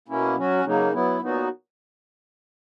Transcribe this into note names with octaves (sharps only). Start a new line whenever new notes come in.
B2 A#3 C#4 E4
F#3 C#4 F#4
C#3 F#3 A#3 D#4
F#3 B3 E4
A#2 F#3 B3 D#4 F#4